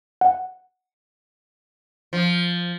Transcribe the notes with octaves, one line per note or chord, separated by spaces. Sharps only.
F#5
F3